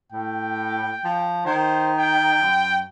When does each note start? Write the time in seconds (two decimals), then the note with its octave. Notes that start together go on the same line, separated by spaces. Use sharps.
0.12 A2 G5
1.05 F3
1.46 D#3 C5
1.98 G5
2.42 F#2